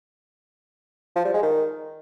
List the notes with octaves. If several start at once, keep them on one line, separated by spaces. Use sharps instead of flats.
F3
G3
G#3
D#3